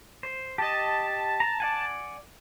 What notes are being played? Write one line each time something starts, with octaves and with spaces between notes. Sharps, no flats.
C5
G4 D#5 A5
A#5
D5 F#5 G#5